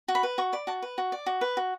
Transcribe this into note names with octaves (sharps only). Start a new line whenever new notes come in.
F#4
B5
B4
F#4 C#6
D5 B5
F#4 A5
B4
F#4
D5
F#4
B4
F#4